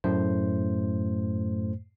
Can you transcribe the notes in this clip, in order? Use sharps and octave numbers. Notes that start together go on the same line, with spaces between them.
F#2 A2 A3 C5